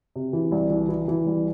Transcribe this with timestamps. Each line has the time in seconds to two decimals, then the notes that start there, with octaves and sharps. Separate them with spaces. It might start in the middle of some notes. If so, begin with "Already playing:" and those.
0.16 C3
0.33 E3
0.52 C2
0.70 E3
0.89 E3
1.08 E3
1.26 C2